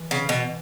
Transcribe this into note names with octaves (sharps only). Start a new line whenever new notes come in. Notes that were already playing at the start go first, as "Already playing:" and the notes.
Already playing: E3
C#3
B2